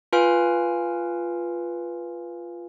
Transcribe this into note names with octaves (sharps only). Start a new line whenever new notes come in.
F4 B4 F5 G#5 F6 D7